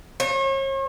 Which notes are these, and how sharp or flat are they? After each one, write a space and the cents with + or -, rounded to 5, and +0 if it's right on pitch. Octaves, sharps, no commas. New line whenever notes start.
C#5 -40